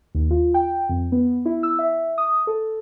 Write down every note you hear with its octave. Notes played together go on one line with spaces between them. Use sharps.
D#2
F4
G5
F2
B3
E4
E6
E5
D#6
A4